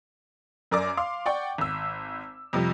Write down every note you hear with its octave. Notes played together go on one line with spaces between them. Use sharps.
F#2 A#4 D5 A#5 D6
F5 C6 D6
D5 F#5 G5 C#6
G#1 E6
F2 C3 F3 G3